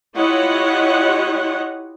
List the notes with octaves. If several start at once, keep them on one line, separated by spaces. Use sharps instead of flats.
E4 F4 G4 C#5 D#5 F#5